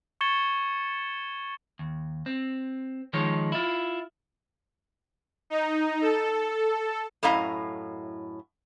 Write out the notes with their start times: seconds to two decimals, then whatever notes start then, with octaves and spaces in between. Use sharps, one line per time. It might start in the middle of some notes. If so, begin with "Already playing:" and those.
0.21 C#6 G#6 A6 C#7 E7 G7
1.79 D#2
2.26 C4
3.13 D#3 F3 G#3 D#4 C#5
3.52 E4 F4
5.50 D#4
6.01 A4
7.23 F#2 A2 E4 D#5 F5 A#5